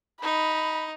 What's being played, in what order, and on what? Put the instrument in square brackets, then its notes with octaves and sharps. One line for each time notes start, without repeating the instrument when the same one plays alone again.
[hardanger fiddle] D#4 [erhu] B5